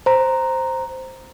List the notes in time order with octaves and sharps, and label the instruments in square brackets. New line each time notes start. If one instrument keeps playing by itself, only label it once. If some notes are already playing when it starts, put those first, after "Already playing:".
[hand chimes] C5 A#5